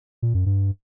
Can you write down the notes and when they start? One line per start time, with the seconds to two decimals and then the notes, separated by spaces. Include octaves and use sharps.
0.22 A#2
0.34 F#2
0.46 G2